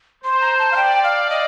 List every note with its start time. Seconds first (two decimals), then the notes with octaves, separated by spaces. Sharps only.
0.23 C5 C6
0.41 A#5
0.59 A5
0.72 F5
0.76 D5 G5
1.04 F5
1.30 D#5